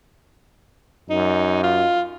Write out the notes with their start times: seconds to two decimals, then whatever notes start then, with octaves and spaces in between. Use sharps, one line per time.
1.10 F#2 D#4
1.63 F4